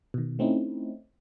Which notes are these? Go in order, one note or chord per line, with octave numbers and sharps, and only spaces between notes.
B2 D#3
A3 C4 C#4 D#4 E4